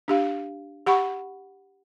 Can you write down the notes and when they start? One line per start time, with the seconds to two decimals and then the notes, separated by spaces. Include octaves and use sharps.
0.08 D4 G4 F5
0.86 G4 F#5 B5 C#6